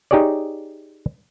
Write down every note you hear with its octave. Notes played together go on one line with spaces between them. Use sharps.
D#4 G4 G#4 C#5 D5